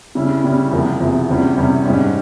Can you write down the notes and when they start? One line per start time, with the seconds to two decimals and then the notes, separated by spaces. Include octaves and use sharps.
0.15 C#3 G3 C#4 E4
0.44 C#3 G3 C#4 E4
0.71 E2 C3 F3 A#3
1.00 E2 C3 F3 A#3
1.29 E2 C3 G3 C#4
1.57 E2 C3 G3 C#4
1.86 G#2 G3 C#4